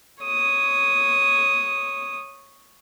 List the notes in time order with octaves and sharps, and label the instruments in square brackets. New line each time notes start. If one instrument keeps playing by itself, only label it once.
[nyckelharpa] C#5 D#6